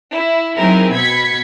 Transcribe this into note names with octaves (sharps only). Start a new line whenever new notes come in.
E4
F#3 C4 D#4 E4 G#4 A#4
B2 B5 G#6 B6 C#7